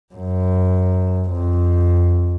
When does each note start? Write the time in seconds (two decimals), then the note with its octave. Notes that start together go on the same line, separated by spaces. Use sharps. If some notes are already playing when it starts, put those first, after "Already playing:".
0.14 F#2
1.31 F2